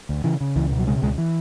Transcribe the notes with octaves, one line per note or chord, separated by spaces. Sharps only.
D2
C#3 E3
C#3
C#2 E3
B2
F#3
C#3 G#3
C#2 G#3
E3